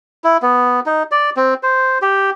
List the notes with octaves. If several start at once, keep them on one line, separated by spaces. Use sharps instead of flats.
E4
B3
D#4
D5
C4
C5
G4